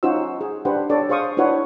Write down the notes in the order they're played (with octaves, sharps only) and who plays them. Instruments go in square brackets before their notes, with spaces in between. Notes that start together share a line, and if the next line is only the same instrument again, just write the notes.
[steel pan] C#4 D#4 F4 F#4 C5 E6
G#4
D4 G4 B4 C5 F#5
D4 G4 A4 B4 C#5 D5
G#4 C5 F5 C#6 D#6
D4 E4 F#4 B4 C#5 F#5